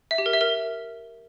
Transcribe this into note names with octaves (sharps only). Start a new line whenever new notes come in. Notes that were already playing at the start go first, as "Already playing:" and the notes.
E5
G4
A#4
E5
A#4